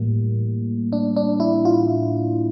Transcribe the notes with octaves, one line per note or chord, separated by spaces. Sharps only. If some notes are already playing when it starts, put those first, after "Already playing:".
Already playing: A2 E3 G3 A#3
D4
D4
E4
F4